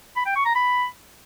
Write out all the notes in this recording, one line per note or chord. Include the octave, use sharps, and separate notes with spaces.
B5
G5
C#6
A#5
B5